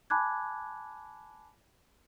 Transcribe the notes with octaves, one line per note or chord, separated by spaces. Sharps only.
G#5 A5 B5 D6 F#6 G#6